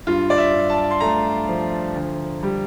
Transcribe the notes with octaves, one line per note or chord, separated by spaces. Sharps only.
G2 F4
D5
E5
G2
A5
C6
A3 A#5
F3
D2
G3